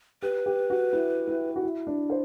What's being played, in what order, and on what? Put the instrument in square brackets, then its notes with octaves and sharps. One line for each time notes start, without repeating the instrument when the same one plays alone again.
[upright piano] G4 [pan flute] B4
[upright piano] G4
F#4
E4
E4
F#4
E4
D4
C5